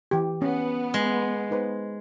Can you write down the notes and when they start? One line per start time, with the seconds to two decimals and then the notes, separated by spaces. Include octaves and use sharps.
0.11 E3 G4
0.42 B3 C#4
0.94 G#3
1.51 D#4 B4 C5